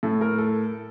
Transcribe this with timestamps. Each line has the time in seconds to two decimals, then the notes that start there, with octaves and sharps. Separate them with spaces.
0.03 A2 A4
0.21 A#4
0.38 A4